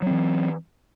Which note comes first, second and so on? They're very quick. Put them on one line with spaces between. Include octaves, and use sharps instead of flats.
F#3 C4 E3